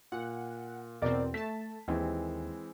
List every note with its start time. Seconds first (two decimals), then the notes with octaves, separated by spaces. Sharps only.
0.12 A#2 F#5
1.02 E2 B2 C4 A#4 D5
1.34 A3 A5 B6
1.88 D#2 E3 G#3 C4